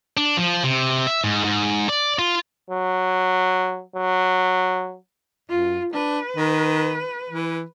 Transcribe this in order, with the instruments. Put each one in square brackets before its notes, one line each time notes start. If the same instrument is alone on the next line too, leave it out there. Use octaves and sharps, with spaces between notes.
[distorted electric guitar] D4
F3
C3
E5
G#2
G#2
D5
F4
[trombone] F#3
F#3
[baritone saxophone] F#2 [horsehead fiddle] F4
[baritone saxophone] D4 [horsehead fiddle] B4
[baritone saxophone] D#3
E3